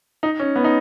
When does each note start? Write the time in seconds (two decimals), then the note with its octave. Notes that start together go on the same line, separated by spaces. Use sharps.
0.23 D#4
0.40 C#4
0.56 B3
0.64 D#4